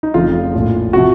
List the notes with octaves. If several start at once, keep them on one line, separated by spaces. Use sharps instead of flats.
D#4
F1 F2 C#3 F4
A#1 A2 F3
C3 F3 F#4